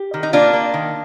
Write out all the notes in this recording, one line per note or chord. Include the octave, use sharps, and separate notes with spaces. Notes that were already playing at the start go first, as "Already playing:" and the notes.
Already playing: G4
D#3
D#4
A#3 D4 F4
A#3
D#3